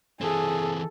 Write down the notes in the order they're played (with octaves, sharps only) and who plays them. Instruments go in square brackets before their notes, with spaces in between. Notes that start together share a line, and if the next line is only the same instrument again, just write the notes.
[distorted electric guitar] E3 C4 [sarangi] G#4 [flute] A4